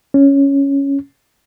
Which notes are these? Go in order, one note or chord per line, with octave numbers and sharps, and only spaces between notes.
C#4